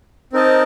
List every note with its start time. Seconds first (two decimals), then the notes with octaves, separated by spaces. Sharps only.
0.33 C4 D#4 A#4 D#5 A5